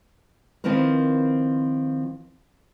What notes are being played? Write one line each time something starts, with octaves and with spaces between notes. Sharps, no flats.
D#3 F3 C4 E4 A#4 B4